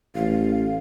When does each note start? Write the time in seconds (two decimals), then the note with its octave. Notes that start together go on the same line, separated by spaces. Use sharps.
0.15 A1 F5